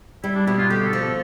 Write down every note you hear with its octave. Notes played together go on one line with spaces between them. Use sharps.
G3 E4
D4
B2 E4
F4
D3 G4
A4
F3
A4